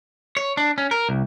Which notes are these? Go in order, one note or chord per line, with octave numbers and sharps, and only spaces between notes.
C#5
D4
C#4
A#4
C2